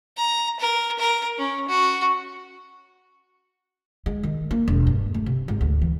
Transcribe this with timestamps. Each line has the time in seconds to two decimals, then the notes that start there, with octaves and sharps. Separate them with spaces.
0.17 A#5
0.60 A#4
0.99 A#4
1.38 C#4
1.68 F#4
4.06 G#3
4.23 D#3
4.51 A#3
4.68 E1
4.87 G2
5.14 A3
5.26 C3
5.48 G#1
5.61 D2
5.82 E3